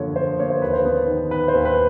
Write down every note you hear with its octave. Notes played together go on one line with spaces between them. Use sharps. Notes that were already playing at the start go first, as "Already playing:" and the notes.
Already playing: F#2 D3 F3 A#3 C#5
D3 C5
A#3 C#5
C5
D#2 B4
C5
B3
D#3
D#3 B4
C5
D#2
B4